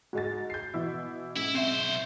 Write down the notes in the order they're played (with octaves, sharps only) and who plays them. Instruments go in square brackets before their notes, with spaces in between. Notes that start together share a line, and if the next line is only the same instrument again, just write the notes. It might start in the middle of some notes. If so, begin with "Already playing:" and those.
[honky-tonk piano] G#2 G#3 A6 [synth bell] F#4
[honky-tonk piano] G6 C7
B2 E3 E4
[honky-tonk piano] G#2 [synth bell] C#4 [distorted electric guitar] E4
[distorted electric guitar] B1 C5 [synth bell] C4 E5